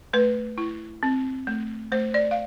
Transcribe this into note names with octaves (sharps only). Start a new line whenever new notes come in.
A3 B4
E4
C4
A3
A3 C5
D5
F5